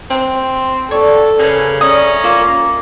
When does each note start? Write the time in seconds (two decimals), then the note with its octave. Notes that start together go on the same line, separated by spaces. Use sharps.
0.10 C4
0.91 A4 C#5 D5 D6
1.39 C#3 G#4 A#4 B4
1.81 C#4 D5 E5 A#5 D#6
2.24 A#3 F4